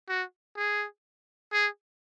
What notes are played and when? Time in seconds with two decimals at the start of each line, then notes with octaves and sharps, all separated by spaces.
0.09 F#4
0.57 G#4
1.53 G#4